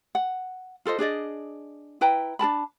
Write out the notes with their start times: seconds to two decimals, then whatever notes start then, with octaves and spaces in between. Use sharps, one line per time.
0.15 F#5
0.85 F4 A4 C5 D#5
0.99 D4 G#4 D5 D#5
2.01 E4 B4 G5 A#5
2.39 D4 A#4 A5 B5